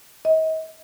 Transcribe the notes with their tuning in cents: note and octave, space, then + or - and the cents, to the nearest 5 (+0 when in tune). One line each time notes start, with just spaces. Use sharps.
D#5 +40